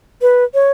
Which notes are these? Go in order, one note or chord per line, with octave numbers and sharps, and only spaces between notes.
B4
C#5